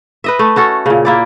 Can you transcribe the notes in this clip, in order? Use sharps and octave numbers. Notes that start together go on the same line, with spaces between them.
B4 D#5 E5
A3
C#4 F#4 A4
A#2 C#3
A#3 E4 D5